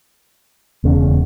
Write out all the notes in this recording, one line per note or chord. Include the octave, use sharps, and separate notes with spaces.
E1 E2 C#3